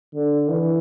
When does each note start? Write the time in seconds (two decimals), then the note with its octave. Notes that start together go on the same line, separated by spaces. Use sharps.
0.15 D3
0.49 E3